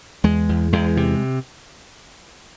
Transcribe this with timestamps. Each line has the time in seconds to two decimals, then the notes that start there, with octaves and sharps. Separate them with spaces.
0.24 E2 G#3
0.49 E2
0.73 E2 G#3
0.97 C3